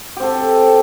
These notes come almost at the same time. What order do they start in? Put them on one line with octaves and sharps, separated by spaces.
G4 C4 A4